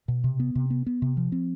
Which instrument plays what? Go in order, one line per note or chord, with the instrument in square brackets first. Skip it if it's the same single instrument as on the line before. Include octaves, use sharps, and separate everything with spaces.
[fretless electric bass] B2
C3
B3
C3
B3
B3
C3
F3
C4